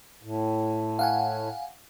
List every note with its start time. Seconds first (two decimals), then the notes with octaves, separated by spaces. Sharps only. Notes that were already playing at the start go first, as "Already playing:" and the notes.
0.23 A2
0.99 F5 F#5 G#5